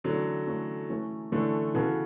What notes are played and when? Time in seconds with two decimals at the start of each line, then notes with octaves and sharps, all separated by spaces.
0.04 D3 E3 F#3 A3 C#4
0.47 E3 A3 C#4
0.89 E3 A3 C#4
1.32 D3 E3 A3 C#4
1.74 C#3 E3 B3 F#4 A4